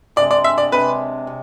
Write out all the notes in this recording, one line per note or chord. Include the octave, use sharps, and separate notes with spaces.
C3 G#3 D4 D5
D5
E5
D5
C3 G#3 D4 B4
C3